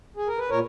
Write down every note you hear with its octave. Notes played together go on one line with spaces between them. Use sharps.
G#4
A#4
B4
A#2 A#4 C#5